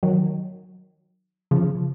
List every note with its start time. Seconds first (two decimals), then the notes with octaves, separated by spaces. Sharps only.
0.03 D#3 F#3
1.51 C#3 F3